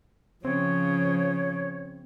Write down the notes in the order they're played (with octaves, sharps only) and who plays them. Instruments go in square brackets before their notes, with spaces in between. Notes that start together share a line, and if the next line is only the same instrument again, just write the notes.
[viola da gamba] C#3 [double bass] F3 [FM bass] C4 [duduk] C#5